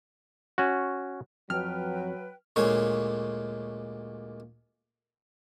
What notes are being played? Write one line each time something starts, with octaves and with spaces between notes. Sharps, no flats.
C#4 F#4
F2 F#3 B4 G5 F6
D2 A#2 G#3 C#5